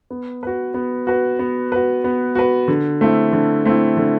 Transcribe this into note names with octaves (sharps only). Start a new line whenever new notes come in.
B3
F#4 B4
B3
F#4 B4
B3
F#4 B4
B3
F#4 B4
D3
A3 C4 E4
D3
A3 C4 E4
D3